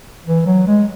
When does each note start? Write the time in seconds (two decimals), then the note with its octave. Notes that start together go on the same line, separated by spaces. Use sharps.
0.26 E3
0.46 F#3
0.67 G#3